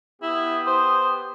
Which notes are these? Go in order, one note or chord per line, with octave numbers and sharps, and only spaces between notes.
B3 E4 G4 D#6
C5